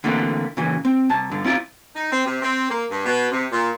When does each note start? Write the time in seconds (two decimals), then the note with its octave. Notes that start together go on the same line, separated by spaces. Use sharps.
0.04 D3 E3 A3 A#3 C4
0.57 A#2 C#3 E3
0.85 C4
1.10 C2 A5
1.31 G2 D3
1.44 C4 E4 F4 D5
1.95 D#4
2.12 C4
2.26 C3
2.42 C4
2.71 A#3
2.91 G2
3.06 B2
3.32 C3
3.52 A#2